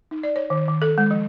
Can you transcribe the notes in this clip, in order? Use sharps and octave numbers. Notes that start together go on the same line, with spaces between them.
D#4
D5
C#5
D#3
D#3
A4
G#3
F3